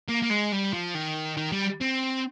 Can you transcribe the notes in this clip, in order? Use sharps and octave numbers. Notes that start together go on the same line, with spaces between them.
A#3
A#3
G#3
G3
F3
D#3
D#3
G3
C4